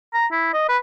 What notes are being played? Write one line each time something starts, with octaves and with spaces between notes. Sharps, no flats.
A#5
E4
D#5
B4